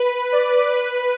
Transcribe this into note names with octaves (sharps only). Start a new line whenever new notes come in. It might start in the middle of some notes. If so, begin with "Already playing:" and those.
Already playing: B4
D5
B4